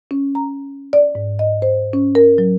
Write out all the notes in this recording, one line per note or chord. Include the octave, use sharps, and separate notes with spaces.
C#4
A#5
D5
G#2
D#5
C5
C#4
A#4
F#3